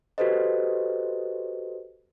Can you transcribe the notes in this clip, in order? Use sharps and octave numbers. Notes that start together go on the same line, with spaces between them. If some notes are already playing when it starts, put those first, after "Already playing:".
F#4 G4 A4 B4 C5 D#5